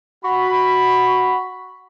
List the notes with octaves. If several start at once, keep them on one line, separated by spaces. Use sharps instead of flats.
F#4 B5